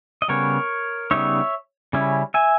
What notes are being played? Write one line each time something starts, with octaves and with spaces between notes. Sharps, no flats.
D#5
C#3 G3 B3 A#4 C#5
C#3 G3 B3 D#4 C#5 E5
C#3 G3 C#4 E4
E5 G#5